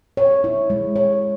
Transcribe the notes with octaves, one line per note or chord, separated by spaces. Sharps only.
C#5
E4
G#3
C#5